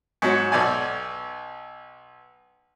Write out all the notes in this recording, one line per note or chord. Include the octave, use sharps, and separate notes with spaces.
G#2 F#3
B1 D5 G#5